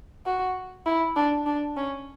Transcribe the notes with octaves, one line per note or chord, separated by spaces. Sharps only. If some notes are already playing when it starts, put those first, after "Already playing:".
F#4
E4
D4
D4
C#4